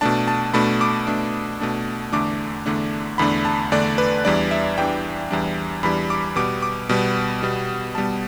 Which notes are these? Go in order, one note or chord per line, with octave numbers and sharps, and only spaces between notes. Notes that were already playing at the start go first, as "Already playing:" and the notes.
B2 A3 D4 A5
A5
B2 A3 D4 B5
D6
B2 A3 D4
B2 A3 D4
E2 D3 A3 D4 D6
E2 D3 A3 D4
E2 D3 A3 D4 B5
A5
E2 D3 A3 D4 D5
B4
E2 E3 G3 D4 D5
E5
E2 E3 G3 D4 G5
E2 E3 G3 D4
E2 E3 G3 D4 B5
D6
B2 G3 B3 D6
D6
B2 G3 B3
B2 G3 B3
B2 G3 B3 A5